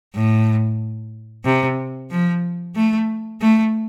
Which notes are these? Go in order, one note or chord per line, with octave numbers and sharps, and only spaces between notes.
A2
C3
F3
A3
A3